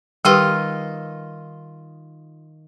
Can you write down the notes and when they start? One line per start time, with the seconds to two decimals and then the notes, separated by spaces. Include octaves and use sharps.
0.25 D#3 G3 F4 G4 B4 D#5